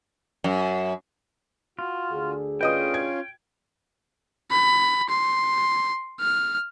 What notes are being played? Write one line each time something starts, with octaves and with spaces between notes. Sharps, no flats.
F#2
F4 F#4
D2 D3 G#4
C#4 F4 B4 D#5 G5 D#6
G#6
B5
C6
F6